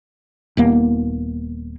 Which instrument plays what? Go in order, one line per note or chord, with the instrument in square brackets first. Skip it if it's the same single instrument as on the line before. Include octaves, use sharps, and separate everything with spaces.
[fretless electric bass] D#1 D#2 A#3 B3